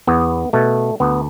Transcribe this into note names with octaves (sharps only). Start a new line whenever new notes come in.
E2 B3
B2 A3
D2 B3